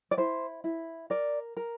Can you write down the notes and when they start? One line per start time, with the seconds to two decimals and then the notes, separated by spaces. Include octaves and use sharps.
0.11 D5
0.17 E4 C5
0.64 E4
1.10 A#4 D5
1.57 A#4